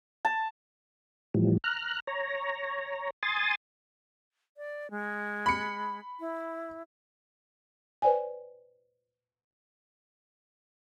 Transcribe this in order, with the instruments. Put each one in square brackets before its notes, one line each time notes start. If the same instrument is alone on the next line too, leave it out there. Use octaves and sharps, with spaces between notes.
[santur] A5
[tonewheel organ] A2 E3 F3 G3
A#5 F6 F#6
C#5 A#5
G#5 C6 D#6 A6
[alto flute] D5
G#3
[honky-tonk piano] B5 C#7
[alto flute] E4
[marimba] B4 C5 D5 G5 G#5